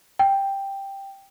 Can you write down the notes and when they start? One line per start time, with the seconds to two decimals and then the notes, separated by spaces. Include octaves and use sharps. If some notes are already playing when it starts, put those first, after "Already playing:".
0.19 G5